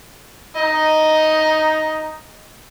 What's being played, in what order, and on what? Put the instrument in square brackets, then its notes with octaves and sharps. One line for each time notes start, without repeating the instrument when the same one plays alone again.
[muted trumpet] D#4 [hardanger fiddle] D#5